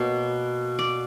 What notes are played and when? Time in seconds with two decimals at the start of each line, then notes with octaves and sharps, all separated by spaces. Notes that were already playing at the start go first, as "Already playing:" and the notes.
Already playing: B2 A#3 C#5
0.79 D5